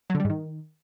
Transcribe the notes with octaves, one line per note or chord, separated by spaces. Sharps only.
F#3
D3
G3
G#2
D#3